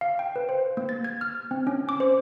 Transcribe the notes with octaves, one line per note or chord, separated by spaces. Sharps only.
F5
G5
B4
C5
A#3
A6
G#6
F6
C4
C#4
D6
C5